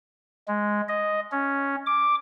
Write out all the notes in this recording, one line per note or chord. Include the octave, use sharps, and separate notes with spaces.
G#3
D#5
C#4
D6